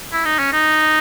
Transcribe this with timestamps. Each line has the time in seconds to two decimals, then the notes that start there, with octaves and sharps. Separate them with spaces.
0.13 E4
0.25 D#4
0.39 C#4
0.52 D#4